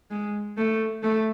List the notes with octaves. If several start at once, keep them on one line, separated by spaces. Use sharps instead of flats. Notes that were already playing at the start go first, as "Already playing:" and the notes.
G#3
A3
A3